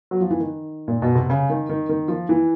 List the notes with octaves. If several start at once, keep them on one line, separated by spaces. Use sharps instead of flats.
F#3
F3
E3
D#3
A#2
B2
C3
C#3
D#3
D#3
D#3
F3
E3